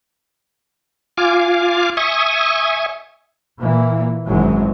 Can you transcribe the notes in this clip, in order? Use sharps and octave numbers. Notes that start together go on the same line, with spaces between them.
F4 F5 G#5 D6
E5 G#5 C#6 D#6
A#2 E3 A#3
G#1 F#2 E3 F#3 G#3